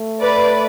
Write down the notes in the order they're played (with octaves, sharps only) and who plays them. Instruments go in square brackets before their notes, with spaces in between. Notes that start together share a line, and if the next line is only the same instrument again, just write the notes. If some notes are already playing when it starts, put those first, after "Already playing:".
Already playing: [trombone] A3
[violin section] B4 D5